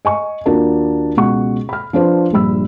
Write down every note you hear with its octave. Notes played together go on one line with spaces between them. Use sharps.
D#5 G#5 C#6
D#2 D4 F4 F#4 A#4 A5
C#2 B2 F#4 F#5 C#6
B5 F6
F3 D4 B4 C5
A#1 G2 G3 B5 E6